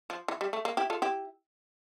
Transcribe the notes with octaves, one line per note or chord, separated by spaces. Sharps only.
F3
E3
G3
A3
A#3
E4 G4
F4 A4
E4 G4